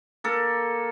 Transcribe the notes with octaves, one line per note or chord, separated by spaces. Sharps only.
A#3 A4